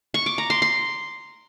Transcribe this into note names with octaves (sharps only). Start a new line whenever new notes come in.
C#6
D6
A#5
C6
C6